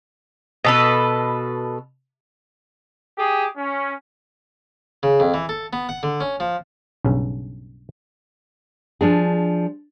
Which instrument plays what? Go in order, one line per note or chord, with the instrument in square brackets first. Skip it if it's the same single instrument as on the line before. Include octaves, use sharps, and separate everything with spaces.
[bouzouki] B2 A4 B4
[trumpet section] G4 G#4 D#6
C#4
[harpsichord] C#3
F2
E3
A4
B3
F#5
D3
C#4
F3
[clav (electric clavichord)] B1 G2 C#3 C#4
[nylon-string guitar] F3 D4 G#4